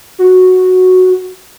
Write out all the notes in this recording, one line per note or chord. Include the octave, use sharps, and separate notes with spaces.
F#4